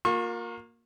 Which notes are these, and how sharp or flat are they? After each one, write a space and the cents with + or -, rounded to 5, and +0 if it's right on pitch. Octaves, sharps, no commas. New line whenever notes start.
A#3 +0 F4 +35 C#6 -35